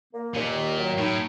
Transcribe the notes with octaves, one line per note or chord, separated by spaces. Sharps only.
A#3
D#2 A#2
D#3
F#3
A2 D#4